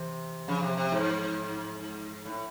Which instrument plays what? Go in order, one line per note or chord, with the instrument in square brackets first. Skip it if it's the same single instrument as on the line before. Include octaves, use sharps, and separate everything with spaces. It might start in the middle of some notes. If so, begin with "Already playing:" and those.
Already playing: [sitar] C3 [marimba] E3
[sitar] C#3 [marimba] F3
[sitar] C3
C3
G#2
A2